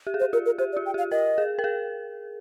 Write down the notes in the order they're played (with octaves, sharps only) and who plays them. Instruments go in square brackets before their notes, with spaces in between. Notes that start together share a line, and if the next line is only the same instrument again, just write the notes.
[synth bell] G4
G#4
[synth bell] G4 [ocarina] C5
[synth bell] F4 [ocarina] A#4
[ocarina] A#4
[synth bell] G4 [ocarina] C5
[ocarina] D5
[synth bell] F4
[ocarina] G5
[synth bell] G4 [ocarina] F5
[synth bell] A#4 [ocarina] D#5
[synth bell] G#4
A#4
G#4